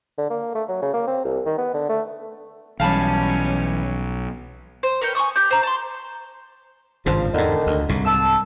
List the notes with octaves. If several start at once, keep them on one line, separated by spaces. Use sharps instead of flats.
D3
A#3
A3
F#3
C#3
A#3
C4
C2
D#3
B3
D3
A3
B1 E3 G3 C#4 F5 A5 B5
C5
A#4 B4 C#5 G5
G#5 C6 C#6 D#6
G4 G6
C5 A#5
A5 C6
G#1 G2 C#3 F3
E2 G#2 D3 D#3
D2
C2 G#2
A5 E6